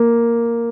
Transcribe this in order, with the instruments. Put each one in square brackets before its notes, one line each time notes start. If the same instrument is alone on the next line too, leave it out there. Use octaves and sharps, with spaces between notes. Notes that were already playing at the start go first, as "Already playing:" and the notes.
Already playing: [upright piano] A#3